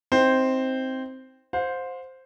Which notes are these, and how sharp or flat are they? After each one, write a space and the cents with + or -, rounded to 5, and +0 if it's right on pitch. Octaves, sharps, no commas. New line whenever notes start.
C4 +0 D#4 +25 C5 +0
C5 +0 F5 +45